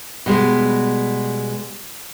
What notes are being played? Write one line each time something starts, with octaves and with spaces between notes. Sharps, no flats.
B2 G3 G#3